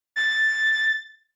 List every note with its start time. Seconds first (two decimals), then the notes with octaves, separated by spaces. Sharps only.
0.16 A6